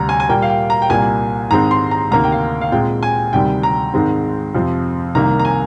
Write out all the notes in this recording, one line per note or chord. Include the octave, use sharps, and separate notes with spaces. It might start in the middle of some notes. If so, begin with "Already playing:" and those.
Already playing: D2 C3 G3 C4 A#5
G#5
G#5
A#2 G3 A#3 G5
F5
G5
A#5
G5
C2 A#2 G3 A#3 G#5
G#2 D#3 G#3 C4 A#5
C6
A#5
D2 C3 D#3 A#3 A#5
G5
F5
F5
A#2 G#3 C4 G5
G#5
D2 C3 D#3 G3 G5
A#5
G#2 D#3 G#3 C4
F2 C3 F3 C4
C2 C3 D#3 G3 A#3 A#5
A#5
G#5